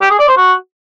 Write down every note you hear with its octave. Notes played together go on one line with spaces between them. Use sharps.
G4
G#4
D5
C5
F#4